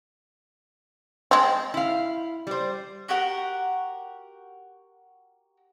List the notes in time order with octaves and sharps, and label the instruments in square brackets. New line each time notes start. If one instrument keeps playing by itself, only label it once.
[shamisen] G#3 C4
[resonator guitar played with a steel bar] E4 F5
G3 C5
[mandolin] F#4 G4 A#4 F#5